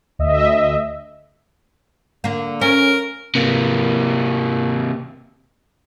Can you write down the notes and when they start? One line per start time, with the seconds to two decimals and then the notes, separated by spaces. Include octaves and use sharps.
0.19 D2 D#5 E5
2.24 D3 A#3
2.61 C#4 A#4
3.35 C3 A#3